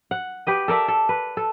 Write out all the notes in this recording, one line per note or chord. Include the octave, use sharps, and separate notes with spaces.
F#5
G4 B4 D#5
A4 A#4 D5 E5
A4
B4
A4